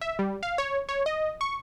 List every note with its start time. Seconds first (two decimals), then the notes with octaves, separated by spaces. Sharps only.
0.01 E5
0.19 G3
0.43 F5
0.58 C#5
0.89 C#5
1.06 D#5
1.41 C#6